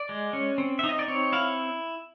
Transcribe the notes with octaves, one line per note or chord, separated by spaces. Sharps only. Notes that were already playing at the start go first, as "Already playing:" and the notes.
Already playing: D5
G#3
C#4
C4
D#4 E5
D#5
D5
C4 C#5
E4 F5